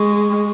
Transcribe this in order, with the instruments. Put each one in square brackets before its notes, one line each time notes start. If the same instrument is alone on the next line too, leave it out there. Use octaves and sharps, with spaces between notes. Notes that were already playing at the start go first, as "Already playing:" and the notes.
Already playing: [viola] G#3 [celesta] C#6